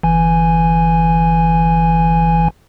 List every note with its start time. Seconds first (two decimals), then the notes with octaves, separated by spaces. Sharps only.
0.03 G1 E3 G#5